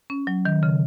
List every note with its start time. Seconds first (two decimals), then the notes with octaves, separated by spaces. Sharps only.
0.10 C#4
0.27 F#3
0.45 D#3
0.63 C#3